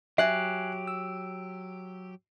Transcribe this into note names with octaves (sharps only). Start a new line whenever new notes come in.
F#3 G4 E5 G#5 F#6 C7
E6